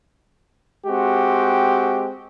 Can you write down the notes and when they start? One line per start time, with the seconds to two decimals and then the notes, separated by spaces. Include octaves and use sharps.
0.87 G#3 C4 F#4 G4